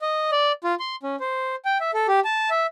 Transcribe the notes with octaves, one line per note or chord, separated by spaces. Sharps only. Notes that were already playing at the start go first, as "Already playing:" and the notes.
D#5
D5
F4
C6
C#4
C5
G5
E5
A4
G4
A5
E5